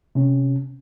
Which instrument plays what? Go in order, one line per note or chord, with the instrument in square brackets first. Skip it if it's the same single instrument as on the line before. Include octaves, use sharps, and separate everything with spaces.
[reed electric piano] C3 C#4